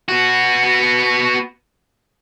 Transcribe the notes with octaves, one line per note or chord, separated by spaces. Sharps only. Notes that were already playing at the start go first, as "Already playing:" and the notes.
B3 F#4